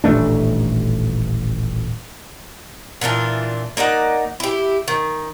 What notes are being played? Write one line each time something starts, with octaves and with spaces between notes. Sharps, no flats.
D#1 A1 A3 D4
A#2 E3 D4 F4
A#3 D#4 D5 F#5
E4 G4
D#3